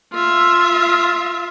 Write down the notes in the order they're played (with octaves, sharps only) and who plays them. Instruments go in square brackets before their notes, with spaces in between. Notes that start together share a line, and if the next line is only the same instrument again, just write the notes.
[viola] F4 E5